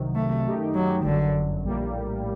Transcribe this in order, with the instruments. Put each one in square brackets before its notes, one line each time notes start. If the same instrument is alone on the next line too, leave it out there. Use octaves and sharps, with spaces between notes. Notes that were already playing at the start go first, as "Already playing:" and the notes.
Already playing: [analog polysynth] C2 C3 D#3 F#3
[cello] A3
[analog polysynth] F#2 D#3 A3 D#4 G4
[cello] F#3
[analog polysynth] G1 F#2 F#3 [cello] D3
[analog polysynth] A#1 A2 G3 A#3